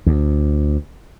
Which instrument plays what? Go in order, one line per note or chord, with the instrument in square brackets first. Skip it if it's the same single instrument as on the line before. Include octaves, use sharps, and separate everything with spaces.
[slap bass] D2